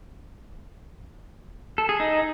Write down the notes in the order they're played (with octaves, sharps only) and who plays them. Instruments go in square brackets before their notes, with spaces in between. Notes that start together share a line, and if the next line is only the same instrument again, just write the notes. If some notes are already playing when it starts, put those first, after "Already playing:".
[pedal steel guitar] A4
G#4
D#4